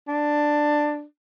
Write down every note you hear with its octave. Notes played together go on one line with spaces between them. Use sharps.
D4